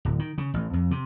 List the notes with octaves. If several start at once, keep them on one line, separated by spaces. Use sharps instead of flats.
D1
D#3
C#3
A1
F2
C3